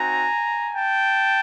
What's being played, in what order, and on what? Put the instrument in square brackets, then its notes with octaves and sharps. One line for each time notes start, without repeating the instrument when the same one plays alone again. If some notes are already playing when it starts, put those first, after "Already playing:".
Already playing: [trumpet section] C4 D#4 F#4 G#5 A#5
G5 A5